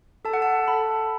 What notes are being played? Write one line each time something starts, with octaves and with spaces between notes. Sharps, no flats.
A4 A5
F#5
A5
A4 B5